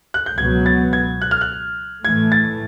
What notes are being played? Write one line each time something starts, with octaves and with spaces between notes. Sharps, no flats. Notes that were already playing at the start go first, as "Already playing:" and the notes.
F#6
G6
C#2 B2 F#3 B3 G#6
A6
G#6
F#6
F6
F#6
A2 E3 A3 G#6
A6